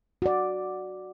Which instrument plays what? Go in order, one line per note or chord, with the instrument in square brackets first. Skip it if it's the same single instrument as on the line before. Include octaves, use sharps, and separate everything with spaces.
[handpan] F#4 D5